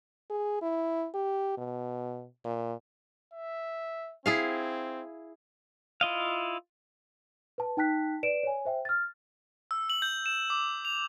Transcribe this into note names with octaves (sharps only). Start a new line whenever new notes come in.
G#4
E4
G4
B2
A#2
E5
C4 E4 G#4 F5
E4 F4 D#5 F5
B4 A5
D#4 G5 A5 F#6 B6
B4 D5 D7 E7
C#5 G#5
C5 E5 G5
F6 A6
E6
F#7
G6
E7
D6
F7